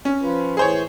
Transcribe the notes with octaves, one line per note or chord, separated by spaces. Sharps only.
C#4
F3 F4 B4
A2 E3 G#4 C5 C#5